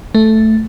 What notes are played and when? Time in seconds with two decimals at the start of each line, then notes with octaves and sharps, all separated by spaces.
0.15 A3